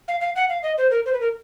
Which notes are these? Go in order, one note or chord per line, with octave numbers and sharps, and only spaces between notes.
F5
F5
F#5
F5
D#5
C5
A#4
C5
B4
A#4